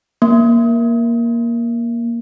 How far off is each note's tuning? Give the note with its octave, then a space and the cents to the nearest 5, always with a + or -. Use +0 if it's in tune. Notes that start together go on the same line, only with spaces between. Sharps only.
A#3 +10